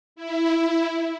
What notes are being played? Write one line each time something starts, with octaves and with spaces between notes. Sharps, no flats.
E4